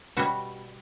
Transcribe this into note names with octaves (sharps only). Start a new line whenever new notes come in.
B2 G3 F#4